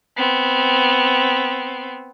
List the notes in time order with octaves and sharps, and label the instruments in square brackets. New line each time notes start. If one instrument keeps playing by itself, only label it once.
[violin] B3 C4